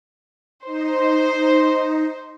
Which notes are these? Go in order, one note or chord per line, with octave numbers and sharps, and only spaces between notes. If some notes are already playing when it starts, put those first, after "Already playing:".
D#4 C5